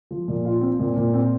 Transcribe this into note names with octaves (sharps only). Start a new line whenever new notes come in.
F3
A#2
F4
C4
A#2
A#2
C4